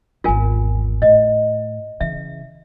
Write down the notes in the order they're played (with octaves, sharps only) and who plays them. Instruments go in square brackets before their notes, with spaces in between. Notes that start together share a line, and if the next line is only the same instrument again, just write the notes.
[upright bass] G#1 E2 [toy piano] F4 A#4 G#5
[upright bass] A2 [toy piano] D#5
[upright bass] C#3 E3 [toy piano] E5